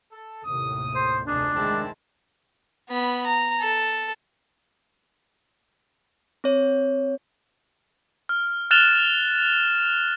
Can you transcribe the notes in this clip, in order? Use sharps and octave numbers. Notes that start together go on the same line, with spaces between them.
A4
D#2 A2 C3 D#6
C5
F1 D2 D4 D#4 G#4 A5
D#3 G#3 C4 E4 A5
B3 B5
A#5
A4
C4 C#5
F6
F6 F#6 A6 E7 F7 G7